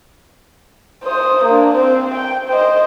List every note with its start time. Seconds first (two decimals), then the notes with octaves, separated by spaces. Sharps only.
1.05 C5 D#6
1.45 A#3 D4
1.75 C4 C5
2.14 G5
2.49 C5 D#5